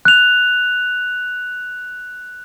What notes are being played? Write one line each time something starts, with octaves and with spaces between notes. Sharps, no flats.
F#6 F7